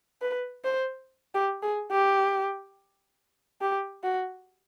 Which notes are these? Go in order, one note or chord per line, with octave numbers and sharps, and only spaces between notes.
B4
C5
G4
G#4
G4
G4
F#4